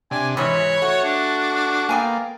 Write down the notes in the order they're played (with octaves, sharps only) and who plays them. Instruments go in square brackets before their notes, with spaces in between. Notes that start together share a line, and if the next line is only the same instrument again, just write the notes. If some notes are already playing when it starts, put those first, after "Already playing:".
[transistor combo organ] C3 D4 [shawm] G#5
[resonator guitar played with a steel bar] G#2 C3 E3 [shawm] C#5 [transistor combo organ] B5
[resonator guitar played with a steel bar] A3 [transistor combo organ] F#4
[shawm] D4
[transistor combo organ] A#3 [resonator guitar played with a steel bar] B3 G5 G#5